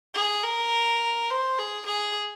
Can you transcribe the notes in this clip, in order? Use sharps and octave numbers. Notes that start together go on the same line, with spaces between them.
G#4
A#4
C5
G#4
G#4